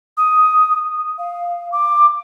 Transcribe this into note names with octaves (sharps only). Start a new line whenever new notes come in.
D#6
F5
D6